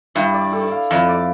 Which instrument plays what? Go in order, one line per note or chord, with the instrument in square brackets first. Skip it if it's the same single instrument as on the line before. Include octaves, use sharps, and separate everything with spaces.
[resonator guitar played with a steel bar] G2 [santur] E4
[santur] D5
A4
F5
[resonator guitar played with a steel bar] F2 [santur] E4
[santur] D5